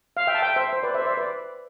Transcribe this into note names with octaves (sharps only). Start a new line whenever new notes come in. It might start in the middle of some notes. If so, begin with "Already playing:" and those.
F5
E5 G5
A5
E5 G5
C5 E5
C5
B4 D5
C5 E5
D5
C5 E5
B4 D5